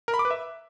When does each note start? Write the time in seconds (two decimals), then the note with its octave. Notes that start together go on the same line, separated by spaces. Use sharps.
0.08 A#4
0.14 B5
0.19 D6
0.25 B4
0.31 E5